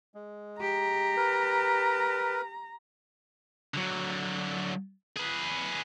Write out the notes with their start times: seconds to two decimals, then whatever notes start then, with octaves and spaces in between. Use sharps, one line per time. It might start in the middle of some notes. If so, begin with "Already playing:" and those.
0.14 G#3
0.61 G4 A#5
1.17 A#4 B4
3.74 D3 F#3
5.17 G#4 B4